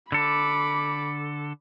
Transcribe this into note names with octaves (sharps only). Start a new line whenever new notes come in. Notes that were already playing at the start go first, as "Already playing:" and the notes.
D3 A4 B5 D6